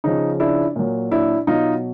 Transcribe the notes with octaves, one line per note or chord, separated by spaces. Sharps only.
C#3 F3 D#4
D4 E4
A#2 F#3
D4 E4
B2 F#3 D#4 F4